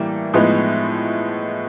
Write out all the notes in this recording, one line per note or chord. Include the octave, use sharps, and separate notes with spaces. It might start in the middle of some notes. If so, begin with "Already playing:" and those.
Already playing: A2 E3 G3 A#3 D4
A2 F3 G#3 B3 D#4